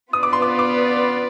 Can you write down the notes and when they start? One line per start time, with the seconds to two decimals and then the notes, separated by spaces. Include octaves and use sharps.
0.13 B3 F4 B4 D5 D#6
0.23 D6
0.33 C6
0.42 D6
0.59 D6